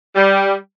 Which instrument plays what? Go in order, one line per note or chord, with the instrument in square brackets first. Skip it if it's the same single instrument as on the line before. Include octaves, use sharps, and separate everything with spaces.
[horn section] G3